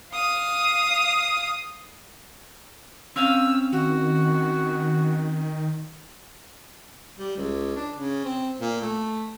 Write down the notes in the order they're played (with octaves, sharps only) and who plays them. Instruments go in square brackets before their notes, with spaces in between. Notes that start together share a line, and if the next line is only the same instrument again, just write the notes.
[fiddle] F5 D#6
[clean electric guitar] C4 C#4 F5 [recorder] E6
[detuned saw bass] D#3 [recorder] F#4
[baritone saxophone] G3
C#2
D4
C#3
C4
A#2
A3